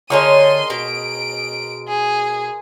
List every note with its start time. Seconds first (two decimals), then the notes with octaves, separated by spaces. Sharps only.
0.10 D3 G#3 A#4 C#5 A5 C6 D#6 D#7
0.70 B2 D7
1.88 G#4